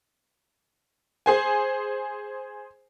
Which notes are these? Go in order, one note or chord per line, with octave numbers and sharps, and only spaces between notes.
G#4 C5 G#5